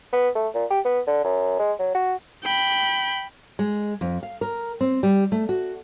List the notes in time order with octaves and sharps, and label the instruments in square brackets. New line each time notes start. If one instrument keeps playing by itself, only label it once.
[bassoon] B3
A3
A#2
G4
B3
D3
F#2
G#3
F#3
F#4
[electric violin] G5 B5
[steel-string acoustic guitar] G#3
F2
F5
A#4
C4
G3
A3
F#4